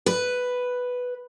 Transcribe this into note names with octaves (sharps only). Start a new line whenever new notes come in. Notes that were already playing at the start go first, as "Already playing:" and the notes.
B4